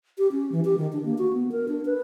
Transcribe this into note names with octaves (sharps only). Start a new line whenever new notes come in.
G4
C#4
E3
G4
D#3
D4
A#3
F#4
B3
A#4
D4
B4